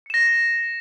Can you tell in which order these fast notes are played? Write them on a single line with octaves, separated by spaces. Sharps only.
C#7 E7 A#6